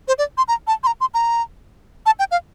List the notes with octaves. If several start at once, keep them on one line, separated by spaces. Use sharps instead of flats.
C5
D5
C6
A#5
A5
C6
A#5
C6
A#5
A5
G5
F5